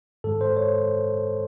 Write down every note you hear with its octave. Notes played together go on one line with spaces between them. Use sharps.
G#2 D#3 G#3 A4
C5
C#5